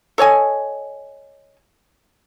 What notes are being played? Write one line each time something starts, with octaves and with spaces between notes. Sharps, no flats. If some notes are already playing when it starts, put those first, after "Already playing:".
A4 C#5 D#5 G#5